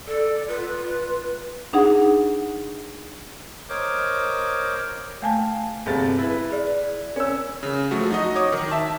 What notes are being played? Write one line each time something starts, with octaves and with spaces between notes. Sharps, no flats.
A4 D5
F4 B4
D4 D#4 G#4 F#5
A#4 C5 C#5 D#5 D6
A3 F5 G#5 A5
G1 C3 G#4 A4 A6
E4 B4
G#4 D5
C#4 A#4 E6
C#3
F3 F#3 A3 F#4
D#4 F#4 D#5
C#5 D6 D#6
D#3
E5 A5